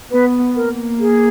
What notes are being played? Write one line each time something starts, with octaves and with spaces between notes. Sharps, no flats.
B3 B4
A#3 A#4
G#4